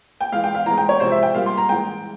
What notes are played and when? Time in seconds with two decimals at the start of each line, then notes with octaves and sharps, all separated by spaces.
0.21 G5
0.32 E3 G#3 F5
0.44 G5
0.55 F5
0.66 E3 G#3 A#5
0.78 G5
0.89 C#5
1.00 C3 F3 G#3 C5
1.12 E5
1.23 G5
1.34 A#2 G3 A#3 F5
1.46 C6
1.57 A#5
1.69 E3 G#3 G5